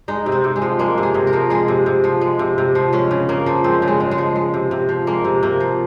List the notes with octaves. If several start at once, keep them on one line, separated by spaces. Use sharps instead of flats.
G#3 D#4
C3
C4
C3
G#3
F3
G#3 A#3
C3
G#4
C3
A#4
F3
G#3 G#4
C3
C3
F3
G#3
C3
C3
F3
G#3 C#4
C#3
C#3 A#3
F3
G#3 C4
C#3
G#3
C#3
G#3
F3
G#3
C3
C3
F3
G#3 A#3
C3
C3 A#3
F3